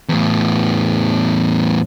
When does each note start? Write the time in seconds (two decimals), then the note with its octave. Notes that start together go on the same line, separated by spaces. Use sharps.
0.09 E2 A2